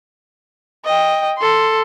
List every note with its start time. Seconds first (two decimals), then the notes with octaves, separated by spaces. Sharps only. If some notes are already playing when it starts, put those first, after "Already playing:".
0.85 D#5 G5
1.38 A4 C6